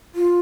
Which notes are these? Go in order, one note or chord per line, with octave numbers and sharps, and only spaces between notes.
F4